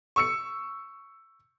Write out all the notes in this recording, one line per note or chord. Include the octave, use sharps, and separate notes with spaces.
C#6 E6 C#7